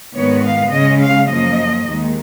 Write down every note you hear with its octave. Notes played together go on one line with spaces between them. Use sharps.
G#2 D#3 G#3 B3 C#5
F5
C#3 G#3 C#4 D#5
F5
F#2 F3 A#3 D#5
D#2 D#3 G#3